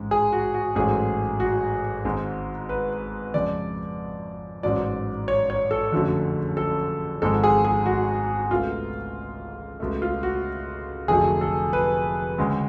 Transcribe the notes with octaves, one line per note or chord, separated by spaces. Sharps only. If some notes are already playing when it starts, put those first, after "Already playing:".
Already playing: A1 G#2 G#3
G#4
F#4
F#4
A1 G#2 F#3 A3 G#4
F#4
G#1 G#2 G#3
B4
F2 C#3 G#3 D5
A1 G#2 F#3 D5
C#5
C#5
A4
F#1 F2 D3 F#3 A3
A4
G#1 G#2 F3 G#3 A4
G#4
G#4
F#4
C#2 B2 A3 F4
C#2 B2 A3
F4
F#4
F1 F2 D3 F#3 A3 G#4
A4
B4
D2 C#3 G#3